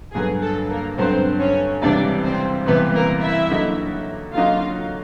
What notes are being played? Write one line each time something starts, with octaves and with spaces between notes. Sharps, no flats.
G2 D3 F#3 B3 G#4
A4
A#3 A#4
G2 D3 F#3 B3 C4 C5
C#4 C#5
C#2 C3 E3 G3 D4 D5
C4 C5
C#2 C3 E3 G3 B3 B4
A#3 A#4
E4 E5
D3 F#3 A#3 D#4 F#4
D3 F#3 A#3 D#4 F4 F#4 F5